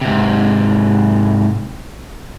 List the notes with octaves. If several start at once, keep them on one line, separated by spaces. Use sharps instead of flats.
G#2 C3